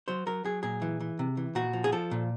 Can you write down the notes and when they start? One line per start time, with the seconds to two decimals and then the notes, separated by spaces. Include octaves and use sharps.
0.08 F#3 C5
0.27 F#3 A#4
0.45 F#3 G#4
0.63 A#2 G#4
0.82 E3
1.00 E3
1.19 C3
1.37 E3
1.55 A#2 F#4
1.73 F3
1.84 G#4
1.92 F3 A4
2.11 A#2